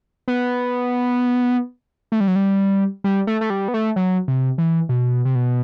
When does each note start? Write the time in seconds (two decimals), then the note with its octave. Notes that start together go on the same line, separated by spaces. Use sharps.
0.28 B3
2.12 A3
2.20 G3
2.28 F#3
2.36 G3
3.04 G3
3.27 A3
3.41 A3
3.50 G3
3.68 B3
3.74 A3
3.96 F#3
4.28 C3
4.58 E3
4.89 B2
5.25 C3
5.35 B2